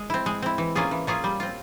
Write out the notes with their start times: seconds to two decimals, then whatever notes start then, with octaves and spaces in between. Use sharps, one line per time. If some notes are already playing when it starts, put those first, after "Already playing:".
Already playing: G#3
0.10 C4 E4
0.26 G#3
0.42 C4 E4
0.58 E3
0.75 A#3 C#4 F4 G#4
0.91 E3
1.07 A#3 C#4 F4 G#4
1.24 G3
1.40 C4 F4